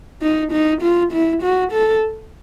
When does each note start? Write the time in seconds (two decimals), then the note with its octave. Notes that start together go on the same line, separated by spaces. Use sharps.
0.22 D#4
0.52 D#4
0.82 F4
1.12 E4
1.43 F#4
1.72 A4